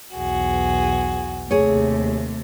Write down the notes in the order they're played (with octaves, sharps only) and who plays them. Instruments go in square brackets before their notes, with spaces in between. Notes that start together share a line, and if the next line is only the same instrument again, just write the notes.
[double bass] B1 E2 [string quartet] F#4 G#4
[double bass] D#2 A3 [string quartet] C3 [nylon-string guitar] G#4 C#5